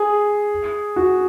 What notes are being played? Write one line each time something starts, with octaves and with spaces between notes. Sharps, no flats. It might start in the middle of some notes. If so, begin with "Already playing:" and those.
Already playing: G#4
F#4